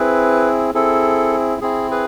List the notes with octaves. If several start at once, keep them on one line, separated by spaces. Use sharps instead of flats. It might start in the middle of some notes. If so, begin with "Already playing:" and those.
Already playing: C4 E4 G#4 B4
C4 E4 G#4 A4
C4 E4 G#4
G#4 B4